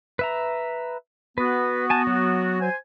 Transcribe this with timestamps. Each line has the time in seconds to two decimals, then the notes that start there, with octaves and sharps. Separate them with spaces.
0.19 B4 E5 A#5
1.38 B3 F#4 B4
1.90 G#5 A5
2.07 F#3
2.61 C5 G#5